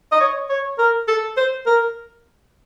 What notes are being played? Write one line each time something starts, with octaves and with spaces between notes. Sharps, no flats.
D#5
C#5
C#5
A#4
A4
C5
A#4